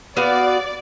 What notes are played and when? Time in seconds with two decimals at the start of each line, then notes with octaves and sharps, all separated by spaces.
0.17 B3 F#4 D5 F5